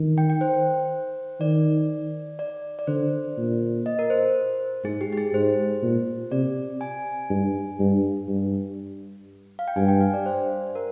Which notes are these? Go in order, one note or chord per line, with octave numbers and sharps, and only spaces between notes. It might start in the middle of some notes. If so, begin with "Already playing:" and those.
Already playing: D#3
G5
G5
C5
D#3 D5
D5
D5
D3 C5
A#2
D#5
A#4
C5
G#2 G#4
G4
G4
G#4
G#2 C5
A#2
C3 D5
G#5
G2
G2
G2
F5
G5
G2 G#5
G5
F5
D5
C5
A#4